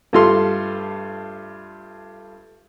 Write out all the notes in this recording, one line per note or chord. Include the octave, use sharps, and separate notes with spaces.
G2 A3 F4 A4 C6